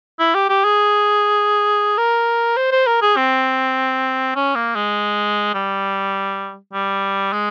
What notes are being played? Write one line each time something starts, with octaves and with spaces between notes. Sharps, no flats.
E4
G4
G4
G#4
A#4
C5
C5
A#4
G#4
C4
C#4
A#3
G#3
G3
G3
G#3